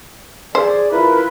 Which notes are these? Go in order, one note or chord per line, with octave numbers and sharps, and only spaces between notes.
G#4 C5 D5
E4 F4 A#4 B4